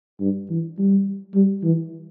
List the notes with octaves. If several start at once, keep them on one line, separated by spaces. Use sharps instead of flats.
G2
E3
G3
G3
E3